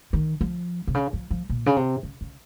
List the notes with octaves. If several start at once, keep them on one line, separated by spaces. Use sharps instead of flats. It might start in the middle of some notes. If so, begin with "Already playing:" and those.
D#3
F3
C3
C#3
F3
F3
A#2
C#3
C3
C#3
C#3